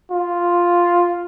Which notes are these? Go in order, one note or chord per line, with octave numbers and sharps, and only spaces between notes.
F4